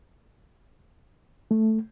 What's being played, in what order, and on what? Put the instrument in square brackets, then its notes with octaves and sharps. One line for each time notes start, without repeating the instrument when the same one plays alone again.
[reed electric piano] A3